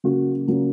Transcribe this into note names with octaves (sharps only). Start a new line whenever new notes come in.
C#3 F#3 A#3 F#4
C#3 F#3 A#3